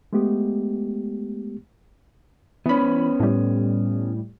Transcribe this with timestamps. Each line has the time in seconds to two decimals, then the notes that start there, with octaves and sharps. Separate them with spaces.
0.13 G#3 A3 B3 G4
2.66 E3 B3 C#4 B5
3.20 A2 G3